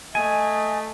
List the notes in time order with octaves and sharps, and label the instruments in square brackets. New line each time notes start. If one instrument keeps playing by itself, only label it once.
[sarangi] A3 [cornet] D#5 [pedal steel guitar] G#5